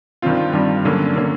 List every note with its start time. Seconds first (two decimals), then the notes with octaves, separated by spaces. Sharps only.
0.22 G2 D#3 G3 C4 F4
0.53 G2 D#3 G3 C4 F4
0.84 D3 F#3 A#3 C#4
1.16 D3 F#3 A#3 C#4